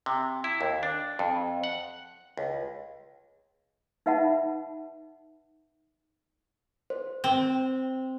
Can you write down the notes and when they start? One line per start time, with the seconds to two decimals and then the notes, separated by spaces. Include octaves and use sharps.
0.06 C3
0.44 E4
0.61 D#2
0.83 D4
1.19 F2
1.64 F#5
2.37 C#2
4.06 D#4 B4 E5 F#5 A5 B5
6.90 C5
7.24 C4